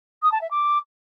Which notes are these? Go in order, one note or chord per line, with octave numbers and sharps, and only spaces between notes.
D#6
A5
E5
D6